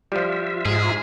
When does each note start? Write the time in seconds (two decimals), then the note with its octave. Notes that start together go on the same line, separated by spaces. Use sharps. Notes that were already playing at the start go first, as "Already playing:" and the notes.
0.12 F3 G3 F4 E5
0.65 G#2 G#4